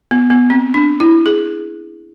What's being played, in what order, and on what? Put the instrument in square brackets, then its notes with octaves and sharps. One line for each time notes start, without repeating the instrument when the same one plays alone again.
[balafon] B3
B3
C4
D4
E4
G#4